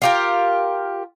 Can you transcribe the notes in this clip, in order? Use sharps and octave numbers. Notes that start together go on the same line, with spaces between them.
F4 G4 A#4